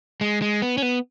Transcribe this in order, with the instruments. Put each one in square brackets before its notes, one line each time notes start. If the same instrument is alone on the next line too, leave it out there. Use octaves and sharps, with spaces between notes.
[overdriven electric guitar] G#3
G#3
B3
C#4
B3